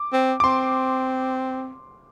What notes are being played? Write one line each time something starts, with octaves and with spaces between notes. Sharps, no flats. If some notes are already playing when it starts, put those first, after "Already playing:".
Already playing: D6
C4
D6
C4 C6